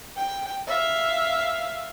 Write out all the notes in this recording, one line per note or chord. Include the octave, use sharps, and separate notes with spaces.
G5
E5 F5